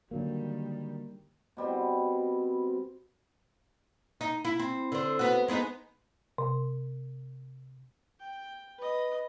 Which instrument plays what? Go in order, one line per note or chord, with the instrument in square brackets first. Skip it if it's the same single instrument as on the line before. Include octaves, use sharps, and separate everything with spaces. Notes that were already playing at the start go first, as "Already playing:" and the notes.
[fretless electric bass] D3 F#3 A#3 [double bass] D#3 G3
[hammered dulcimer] B2 G3 C4
[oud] D#4
E4
C4
D3 C5
B3 F#4
G#3 B3 D#4
[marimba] C3
[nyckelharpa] G5
B4 D#5